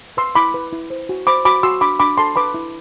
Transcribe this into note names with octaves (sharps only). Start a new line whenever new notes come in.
B4 C6 E6
E4 B5 D6
B4
E4
C5
F#4
C5 B5 D6
F#4 B5 D6
F#4 C6 E6
D4 B5 D6
D4 B5 D6
A4 A5 C6
B4 B5 D6
E4